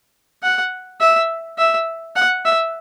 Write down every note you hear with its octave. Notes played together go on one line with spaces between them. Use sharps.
F#5
E5
E5
F#5
E5